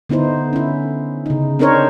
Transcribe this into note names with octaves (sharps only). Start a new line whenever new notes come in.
D3 B3 D#4 E4 C5
C#4 E4
C#3 D#4
C4 D4 D#4 A#4 C5 C#5